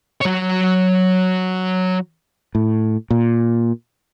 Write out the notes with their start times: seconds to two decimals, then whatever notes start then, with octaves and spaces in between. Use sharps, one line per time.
0.21 F#3 C#5
2.55 A2
3.11 A#2